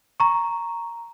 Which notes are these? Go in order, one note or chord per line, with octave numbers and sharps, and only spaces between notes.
A#5 C#6